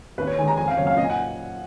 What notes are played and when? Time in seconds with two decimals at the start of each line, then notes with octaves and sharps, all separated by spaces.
0.18 D#2 B4
0.27 C#5
0.38 D#3 G#5
0.41 G#3
0.48 A#5
0.57 F2 G#5
0.68 F5
0.77 C#3 F#3 A#3 C#5
0.87 F5
0.97 A#2 D#5
1.04 G#5
1.10 F#5